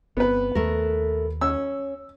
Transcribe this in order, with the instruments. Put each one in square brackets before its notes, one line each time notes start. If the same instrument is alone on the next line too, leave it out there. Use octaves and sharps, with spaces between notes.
[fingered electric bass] G1 C4 [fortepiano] B3 B4
[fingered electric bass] D#2 [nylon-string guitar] A3 A#4
[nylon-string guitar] C#4 [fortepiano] E6